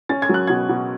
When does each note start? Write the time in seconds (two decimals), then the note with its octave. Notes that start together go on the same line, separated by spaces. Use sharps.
0.09 C#4 A6
0.22 G#6
0.29 F#3 F#6
0.47 B2 G#6
0.69 B2